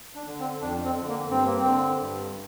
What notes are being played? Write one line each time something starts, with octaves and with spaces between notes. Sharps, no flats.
D4
D3
C4
F2 D4
C4
D3
A#3
G2 C4
A#3
C4
D3
G2